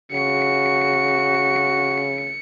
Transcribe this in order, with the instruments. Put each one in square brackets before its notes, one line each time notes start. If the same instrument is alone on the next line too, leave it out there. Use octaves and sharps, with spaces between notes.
[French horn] C#3 [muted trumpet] F#4 [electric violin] C#7